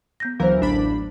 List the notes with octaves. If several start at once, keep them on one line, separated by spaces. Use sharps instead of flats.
B3 G6 A#6
D2 E3 F#3 A#4 C5
A1 D4 B5